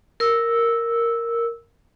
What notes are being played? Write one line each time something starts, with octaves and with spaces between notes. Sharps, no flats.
A#4 E6